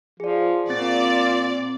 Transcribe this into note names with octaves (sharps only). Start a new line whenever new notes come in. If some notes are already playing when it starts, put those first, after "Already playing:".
F3 G#4 D5
A#2 C4 D5 A6